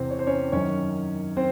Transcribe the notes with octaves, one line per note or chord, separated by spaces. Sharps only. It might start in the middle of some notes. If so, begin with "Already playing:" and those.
Already playing: E2 C3 E3 C4 C5
C#5
C5
C#4 C#5
F#2 D#3 C#4 C#5
C4 C5